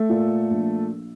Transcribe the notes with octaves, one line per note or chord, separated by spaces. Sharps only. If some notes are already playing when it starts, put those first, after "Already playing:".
Already playing: A3 A4
A#2
A#1